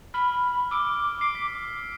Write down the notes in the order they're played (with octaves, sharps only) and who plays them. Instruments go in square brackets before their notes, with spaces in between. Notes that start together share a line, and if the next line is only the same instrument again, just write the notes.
[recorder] B5 [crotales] F6
[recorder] D6 [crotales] E6
[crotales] C7 D7
B6